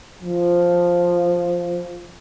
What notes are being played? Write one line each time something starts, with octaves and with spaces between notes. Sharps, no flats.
F3